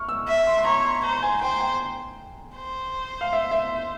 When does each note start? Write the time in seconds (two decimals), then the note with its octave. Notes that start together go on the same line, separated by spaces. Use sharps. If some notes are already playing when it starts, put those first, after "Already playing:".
Already playing: C#6 F6
0.09 E6
0.28 E5
0.47 C6
0.58 C6
0.65 C#5 A#5
0.85 C6
1.04 C5 A#5
1.22 G#5
1.41 C5 G5
1.61 G5
2.56 C5
3.21 F5
3.33 E5
3.51 E5